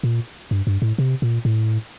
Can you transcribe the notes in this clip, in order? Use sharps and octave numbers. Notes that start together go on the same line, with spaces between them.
A#2
G2
G2
A2
C3
A#2
A2